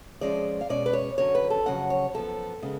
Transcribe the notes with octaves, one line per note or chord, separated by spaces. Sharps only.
F2 F3 G#3 C#4 D5
F5
B2 G#3 C#4 D5
B4
C#5
F#2 D3 F#3 C#4 C#5
B4
A4
F2 C#3 F#3 C#4 F#5
C#5
F#2 F3 B3 A4
C#3 G#3 B3